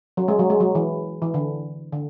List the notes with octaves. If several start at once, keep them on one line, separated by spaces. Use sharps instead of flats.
F#3
G#3
F#3
G#3
F#3
E3
E3
D3
D3